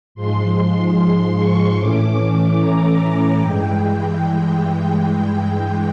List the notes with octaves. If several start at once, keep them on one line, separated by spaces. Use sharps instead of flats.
G#2 F3 G#3 C6
C6
C6
C#6
A2 E3 A3 C#4 D6
A#5
A#5
G2 E3 G#3 G5